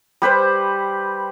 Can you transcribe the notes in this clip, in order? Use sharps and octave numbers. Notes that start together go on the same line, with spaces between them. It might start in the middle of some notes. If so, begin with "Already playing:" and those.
G3 G4 B4 C5